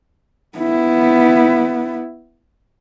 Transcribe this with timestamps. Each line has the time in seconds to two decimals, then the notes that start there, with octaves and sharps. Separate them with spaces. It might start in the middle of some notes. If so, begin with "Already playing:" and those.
0.58 B3 E4